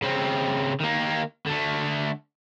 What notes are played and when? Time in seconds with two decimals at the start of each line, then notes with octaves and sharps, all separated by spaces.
0.02 C#3 C4
0.81 D#3 A#3
1.47 D3 A3